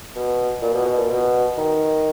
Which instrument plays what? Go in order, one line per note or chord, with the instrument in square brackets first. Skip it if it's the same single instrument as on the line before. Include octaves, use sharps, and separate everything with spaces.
[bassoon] B2
A#2
B2
B2
A#2
B2
D#3